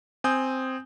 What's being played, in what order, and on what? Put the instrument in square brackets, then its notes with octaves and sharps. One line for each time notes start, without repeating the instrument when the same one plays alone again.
[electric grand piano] C4 G#5 D#6 G6